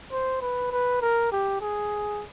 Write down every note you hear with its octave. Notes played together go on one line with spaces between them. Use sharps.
C5
B4
B4
A#4
G4
G#4